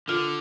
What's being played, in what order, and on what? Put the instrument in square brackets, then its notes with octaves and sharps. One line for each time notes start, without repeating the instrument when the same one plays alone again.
[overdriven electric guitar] D3 [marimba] F4